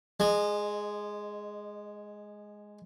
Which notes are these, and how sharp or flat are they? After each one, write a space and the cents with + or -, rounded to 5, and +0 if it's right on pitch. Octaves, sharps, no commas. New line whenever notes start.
G#3 +0 D#5 -25